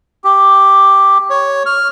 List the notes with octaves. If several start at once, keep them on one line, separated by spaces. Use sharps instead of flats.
G4
C#5
F6